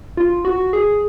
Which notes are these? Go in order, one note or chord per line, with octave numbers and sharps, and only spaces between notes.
F4
F#4
G#4